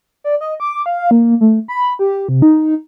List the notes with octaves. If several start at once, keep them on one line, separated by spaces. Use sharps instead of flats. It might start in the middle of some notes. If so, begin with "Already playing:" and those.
D5
D#5
D6
F5
A#3
A3
B5
G4
C3
D#4